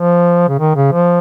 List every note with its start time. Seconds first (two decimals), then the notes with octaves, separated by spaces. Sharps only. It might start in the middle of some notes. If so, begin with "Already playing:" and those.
Already playing: F3
0.49 C#3
0.59 D#3
0.76 C#3
0.92 F3